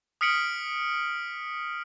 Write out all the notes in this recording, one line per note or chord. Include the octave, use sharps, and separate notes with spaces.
D#6 F6 B6 C#7 D7 F#7